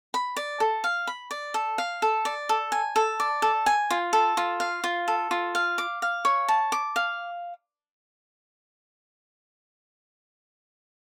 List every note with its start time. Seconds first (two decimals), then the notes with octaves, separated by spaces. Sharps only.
0.14 B5
0.37 D5
0.60 A4
0.84 F5
1.07 B5
1.31 D5
1.54 A4
1.78 F5
2.02 A4
2.25 D5
2.49 A4
2.72 G#5
2.96 A4
3.20 D5
3.42 A4
3.66 G#5
3.90 F4
4.13 A4
4.37 F4
4.60 F5
4.84 F4
5.08 A4
5.31 F4
5.55 F5
5.78 D6
6.02 F5
6.25 C#5
6.48 A5
6.72 D6
6.96 F5